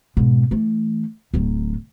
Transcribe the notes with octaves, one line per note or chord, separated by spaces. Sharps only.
G#2 B2
E3 A3
D1 F#3